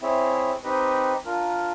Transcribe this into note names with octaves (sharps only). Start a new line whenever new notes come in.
C4 E4 G#4 C#5 E5
C4 D#4 G4 B4 D#5
D4 F4 A#4